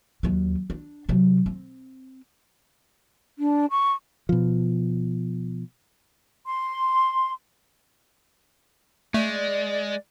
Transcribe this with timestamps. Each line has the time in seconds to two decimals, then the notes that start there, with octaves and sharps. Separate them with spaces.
0.23 D#2 F#3
0.70 D4
1.09 C3 F#3
1.46 C4
3.38 D4
3.70 C#6
4.29 B2 F3
6.46 C6
9.14 G#3 A3 D5